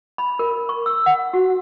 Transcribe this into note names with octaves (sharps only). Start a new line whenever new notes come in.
B5
A#4
C#6
E6
F#5
F#4